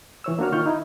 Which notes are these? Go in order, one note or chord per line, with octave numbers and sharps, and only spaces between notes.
E3 C#5 E6
A#3 D4 F#4 C#5 F6
D#3 F4 C#6 F6 G6
D#4 E4